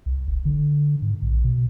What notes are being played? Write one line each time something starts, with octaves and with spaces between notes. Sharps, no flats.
C2
F1
D3
G#2
A#1
B2